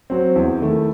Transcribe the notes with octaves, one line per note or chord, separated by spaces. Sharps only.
F#3 C4
E2
D#3 A3 E4